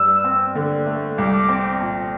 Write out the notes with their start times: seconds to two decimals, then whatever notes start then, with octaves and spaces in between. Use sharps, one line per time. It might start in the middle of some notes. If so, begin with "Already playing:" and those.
Already playing: G2 E6
0.24 C4
0.55 D3
0.86 A3
1.17 C2 D6
1.49 C4
1.80 A#2